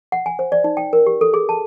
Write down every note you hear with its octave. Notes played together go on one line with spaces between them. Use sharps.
F#5
G#5
C5
D5
D#4
G5
A#4
G4
A4
G#4
A5